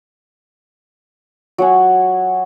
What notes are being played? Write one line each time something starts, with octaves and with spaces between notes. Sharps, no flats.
F#3 F#5 G#5